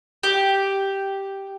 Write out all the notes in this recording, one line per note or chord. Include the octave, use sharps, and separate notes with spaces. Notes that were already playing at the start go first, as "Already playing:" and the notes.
G4